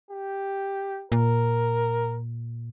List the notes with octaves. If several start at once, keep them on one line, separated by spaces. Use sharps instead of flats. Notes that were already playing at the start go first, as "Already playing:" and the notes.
G4
A#2 A#4